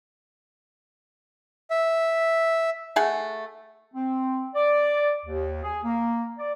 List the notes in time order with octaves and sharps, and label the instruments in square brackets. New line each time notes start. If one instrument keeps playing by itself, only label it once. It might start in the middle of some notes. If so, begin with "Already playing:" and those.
[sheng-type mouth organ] E5
[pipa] A3 G#4 F#5
[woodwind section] C4
D5
D#2
G#4
A#3
D5